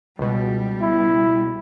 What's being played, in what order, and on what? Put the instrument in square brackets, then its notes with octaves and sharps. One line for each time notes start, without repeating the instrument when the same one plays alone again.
[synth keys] C#2 B2 [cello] G3
[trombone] E4